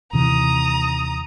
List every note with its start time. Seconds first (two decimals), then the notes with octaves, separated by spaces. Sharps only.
0.13 D#2 C3 E3 A#5 D#6